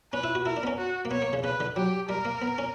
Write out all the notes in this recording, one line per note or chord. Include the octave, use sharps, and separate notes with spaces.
C#4 B4
E4
F#4
E4 A#4
D4
B3
C#4
F#4
A#3
B3 C#5
A#3
C#3
C#3 B4
D3
F#3 G4
G3 A#4
A#3
B3
C#4